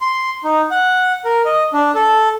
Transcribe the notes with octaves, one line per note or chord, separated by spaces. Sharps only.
C6
D#4
F#5
A#4
D#5
D4
A4